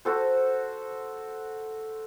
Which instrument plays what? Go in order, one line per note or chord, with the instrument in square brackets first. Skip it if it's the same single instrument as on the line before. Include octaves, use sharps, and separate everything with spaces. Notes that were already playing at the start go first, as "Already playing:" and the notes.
[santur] F#4 A4 C5